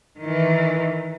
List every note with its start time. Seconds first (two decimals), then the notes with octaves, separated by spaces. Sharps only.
0.19 D#3 E3